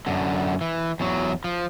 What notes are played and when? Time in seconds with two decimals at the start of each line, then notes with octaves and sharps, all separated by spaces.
0.07 F#2 D3
0.61 E3
1.00 E2 F#3
1.44 F3